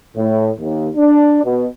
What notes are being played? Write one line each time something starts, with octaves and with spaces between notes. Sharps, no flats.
A2
D#2
D4
B2